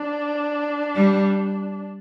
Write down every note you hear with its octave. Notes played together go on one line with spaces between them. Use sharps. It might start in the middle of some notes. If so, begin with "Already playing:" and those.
Already playing: D4
G3